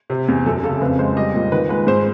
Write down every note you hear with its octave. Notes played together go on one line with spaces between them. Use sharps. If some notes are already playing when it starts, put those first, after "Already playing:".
C3
E2
F#2 A4
C#3 A4
F2 B4
G#3 C5
G3 D#5
A#2
D#3 B4
G#3 B4
G#2 C5